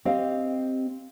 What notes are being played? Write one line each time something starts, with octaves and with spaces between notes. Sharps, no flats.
C4 G4 D#5 F5